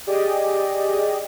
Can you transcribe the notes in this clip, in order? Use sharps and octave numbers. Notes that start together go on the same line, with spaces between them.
G4 G#4 D5 D#5